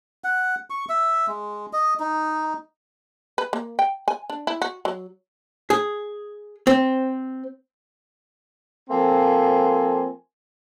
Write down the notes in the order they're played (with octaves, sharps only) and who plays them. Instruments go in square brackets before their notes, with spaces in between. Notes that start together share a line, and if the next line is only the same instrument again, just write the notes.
[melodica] F#5
C#6
E5
G#3
D#5
D#4
[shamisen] B4
A#3
G5
G#5
D4
E4
F#4
F#3
[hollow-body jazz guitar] G#4
C4
[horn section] F3 A#3 C4 A4 G#5